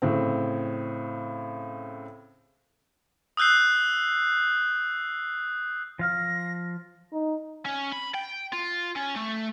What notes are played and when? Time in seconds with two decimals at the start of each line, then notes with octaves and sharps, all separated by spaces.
0.02 A2 C#3 C4
3.37 D#6 E6 F#6 G6 C7
5.99 F3 F5 F6 A#6
7.13 D#4
7.66 C#4
7.92 B5
8.14 G5
8.53 F4
8.96 C#4
9.16 A3